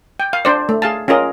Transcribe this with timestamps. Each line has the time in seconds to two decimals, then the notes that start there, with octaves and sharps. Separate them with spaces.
0.20 G5
0.33 F5
0.45 D4 C5 D5
0.69 A3
0.82 G#4 F5 A5
1.08 C#4 F4 G#4 A#4 D#5